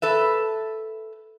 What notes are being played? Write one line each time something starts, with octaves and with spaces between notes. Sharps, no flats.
A4 B4 E5